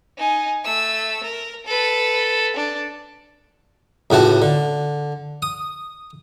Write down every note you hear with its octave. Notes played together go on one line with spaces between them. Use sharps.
D#4 G#5
A3 E6
A#4
A4 B4
D4
C#2 A2 F#4 A5
D3
D#6